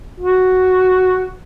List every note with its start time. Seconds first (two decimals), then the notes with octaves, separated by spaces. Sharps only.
0.20 F#4